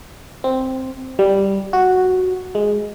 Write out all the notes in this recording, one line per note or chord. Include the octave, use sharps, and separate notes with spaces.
C4
G3
F#4
G#3